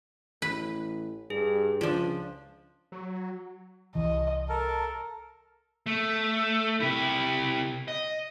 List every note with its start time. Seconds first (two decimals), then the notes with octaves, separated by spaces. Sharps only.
0.42 A1 B4
1.30 G2 G#4
1.81 C#2 F3 D4 F4
2.92 F#3
3.95 C2 E3 D#5
4.49 A4 A#4 A5
5.86 A3
6.80 C3 E4
7.88 D#5